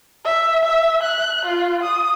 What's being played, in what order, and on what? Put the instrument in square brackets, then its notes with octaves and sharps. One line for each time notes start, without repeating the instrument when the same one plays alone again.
[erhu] E5
E5
F#6
F4
D#6